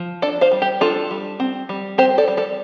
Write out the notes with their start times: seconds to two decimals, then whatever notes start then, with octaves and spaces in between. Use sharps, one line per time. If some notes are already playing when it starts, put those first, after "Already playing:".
Already playing: F3
0.22 D4 A4 D5
0.41 C5 F5
0.52 G3
0.62 G4
0.81 D4 F4 A4
1.11 G3
1.40 C4
1.69 G3
1.98 C4 G4 C5
2.18 A4 D5
2.28 G3
2.37 A4 D5